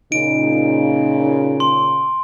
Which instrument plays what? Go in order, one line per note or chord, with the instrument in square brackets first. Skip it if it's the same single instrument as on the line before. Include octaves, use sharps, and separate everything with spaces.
[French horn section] A#2 C#3 [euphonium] D#4 [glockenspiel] D7
[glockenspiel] C6